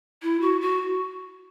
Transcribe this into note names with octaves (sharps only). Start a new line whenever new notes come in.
E4
F#4
F#4